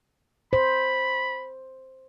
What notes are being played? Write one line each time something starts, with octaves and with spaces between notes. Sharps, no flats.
C5 B5